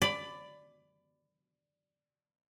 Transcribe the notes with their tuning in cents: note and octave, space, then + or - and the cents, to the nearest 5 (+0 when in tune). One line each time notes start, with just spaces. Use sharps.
D5 +0 B5 +20